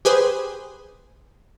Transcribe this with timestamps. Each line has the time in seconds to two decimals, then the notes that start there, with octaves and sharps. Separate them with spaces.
0.05 G4 G#4 B4 C5